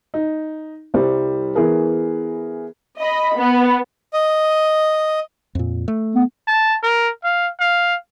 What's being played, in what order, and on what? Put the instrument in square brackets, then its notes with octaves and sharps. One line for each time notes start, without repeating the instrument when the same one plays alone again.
[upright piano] D#4
C2 G3 C5
E3 B3 G#4 A#4
[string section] D#5 B5
B3
[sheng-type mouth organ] D#5
[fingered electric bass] F2 A#2
A3
[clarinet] B3
[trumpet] A5
A#4
F5
F5